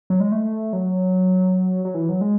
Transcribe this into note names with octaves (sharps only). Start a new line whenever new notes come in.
F#3
G#3
A3
F#3
F#3
E3
F#3
G#3